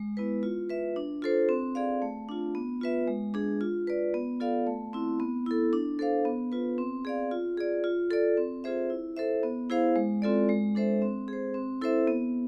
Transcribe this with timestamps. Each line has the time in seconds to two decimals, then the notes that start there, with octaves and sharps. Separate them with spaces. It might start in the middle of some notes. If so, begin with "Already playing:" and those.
Already playing: G#3
0.17 B3 E4 B4
0.43 F4
0.70 B4 E5
0.96 D4
1.22 F4 A4 C5
1.49 C4
1.75 G#4 D5 F5
2.02 A3
2.29 D4 F4
2.55 B3
2.81 F4 B4 E5
3.08 G#3
3.34 D4 G#4
3.61 F4
3.87 B4 D5
4.14 B3
4.40 F4 A4 D5 F5
4.67 A3
4.93 C4 E4
5.20 B3
5.46 E4 A4
5.73 D4
5.99 A4 C5 F5
6.25 B3
6.52 F4 B4
6.78 C4
7.05 G#4 D5 F5
7.31 F4
7.57 G#4 D5
7.84 F4
8.11 A4 D5
8.37 C4
8.64 F4 G#4 C5 E5
8.90 E4
9.17 A4 C5 E5
9.43 B3
9.70 E4 G#4 C5 F5
9.96 G#3
10.22 C4 F4 A4 D5
10.49 G#3
10.75 D4 A4 C5 E5
11.02 C4
11.28 G#4 C5
11.54 C4
11.82 E4 A4 C5 E5
12.07 B3